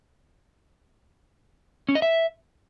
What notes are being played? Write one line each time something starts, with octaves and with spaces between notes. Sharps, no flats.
C#4
D#5
E5